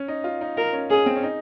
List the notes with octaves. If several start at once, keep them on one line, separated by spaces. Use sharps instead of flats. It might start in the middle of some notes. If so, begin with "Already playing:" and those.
Already playing: C#4
D#4
F4
D#4
F4 A#4
C#4
C#4 G#4
C4
C#4
D#4